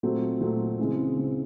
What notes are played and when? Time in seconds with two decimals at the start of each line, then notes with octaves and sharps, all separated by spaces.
0.03 A#2 F#3 A3 C4
0.41 A#2 F#3 A3 C4
0.79 C#3 E3 G#3 C4
1.16 C#3 E3 G#3 C4